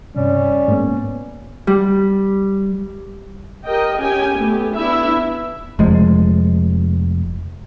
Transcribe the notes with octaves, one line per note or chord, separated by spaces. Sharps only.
C#2 G2 C3 G3 C#4
G#2 A#3 B3
G3
G4 A#4 D#5 G5
C#4 G4 G5 G#5
A3 B3 G4
B3 D4 E4 E5
F1 F3 G#3